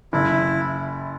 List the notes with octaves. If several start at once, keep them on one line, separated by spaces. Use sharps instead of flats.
F#1 E4